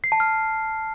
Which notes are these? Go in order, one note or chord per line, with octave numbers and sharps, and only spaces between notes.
C7
A5
F6